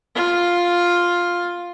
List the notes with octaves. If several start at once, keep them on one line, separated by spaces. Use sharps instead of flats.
F4 F5